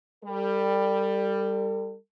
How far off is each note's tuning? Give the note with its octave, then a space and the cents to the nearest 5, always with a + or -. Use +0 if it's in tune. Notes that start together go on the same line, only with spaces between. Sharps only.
G3 +10 A4 +45